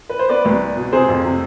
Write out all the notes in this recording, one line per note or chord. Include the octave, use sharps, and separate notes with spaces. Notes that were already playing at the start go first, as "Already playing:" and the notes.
B4
C5
B3 B4 D5
C2
B3
B2
C3 G#4 C5
F2
C3